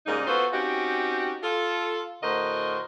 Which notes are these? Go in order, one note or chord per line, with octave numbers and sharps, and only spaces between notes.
G#2 C#3 G3 A#3 D#4
B3 F4 F#4 A4 B4 C5
C4 C#4 D#4 F#4 G4
F4 A4
A2 D3 F#4 A#4 C5 D#5